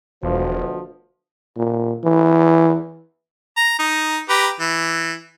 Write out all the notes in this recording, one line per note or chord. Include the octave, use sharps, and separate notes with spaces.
E1 D2 B2 F3
A#2
E3
A#5
D#4
G4 B4 A#5
E3